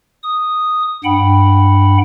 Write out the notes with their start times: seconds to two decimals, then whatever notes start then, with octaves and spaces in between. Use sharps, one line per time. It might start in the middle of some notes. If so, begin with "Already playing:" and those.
0.23 D#6
1.04 G2 F#5 G5 B5